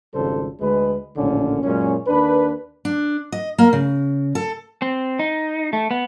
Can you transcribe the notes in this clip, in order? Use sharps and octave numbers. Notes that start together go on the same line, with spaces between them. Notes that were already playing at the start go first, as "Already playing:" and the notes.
G#1 F2 C#3 G3 A4 C5
D2 G#3 B4
A#1 D#2 A2 D3 C#4
F#2 A#2 G#3 C#4
D#2 A#3 D4 B4
D4
D#5
A#3
C#3
A4
C4
D#4
A3
B3